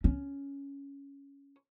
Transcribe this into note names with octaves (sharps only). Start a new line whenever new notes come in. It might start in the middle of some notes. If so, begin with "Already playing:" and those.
C#4